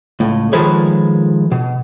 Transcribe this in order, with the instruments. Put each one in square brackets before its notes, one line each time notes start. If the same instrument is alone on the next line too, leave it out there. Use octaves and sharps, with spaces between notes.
[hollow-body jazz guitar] C#2 A2
D#3 F3 G#3 A4 B4 C#5
B2